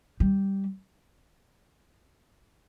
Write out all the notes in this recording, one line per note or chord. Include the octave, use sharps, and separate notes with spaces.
G3